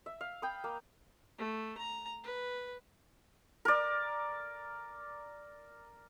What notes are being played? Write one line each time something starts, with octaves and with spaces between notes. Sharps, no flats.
E5
F5
G5 B5 D#6
A#3
A3
A#5
B4
A#4 D5